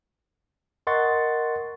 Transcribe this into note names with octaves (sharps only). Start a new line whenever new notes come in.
A#4 D#5 F#5 C6 C#6 A6